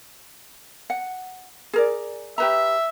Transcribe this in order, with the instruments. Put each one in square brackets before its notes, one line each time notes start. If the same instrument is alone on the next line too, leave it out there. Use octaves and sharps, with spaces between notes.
[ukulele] F#5
G#4 A#4 D5
[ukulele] G4 B4 A#5 [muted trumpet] E5